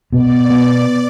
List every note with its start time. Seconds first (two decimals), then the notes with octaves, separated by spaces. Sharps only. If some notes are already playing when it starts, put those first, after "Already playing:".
0.13 B2 D5
0.50 B3